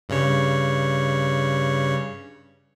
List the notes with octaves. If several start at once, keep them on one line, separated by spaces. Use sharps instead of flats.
G2 C#3 C#5